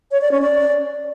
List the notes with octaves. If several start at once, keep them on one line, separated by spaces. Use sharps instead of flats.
C#5
D5
C#4
D5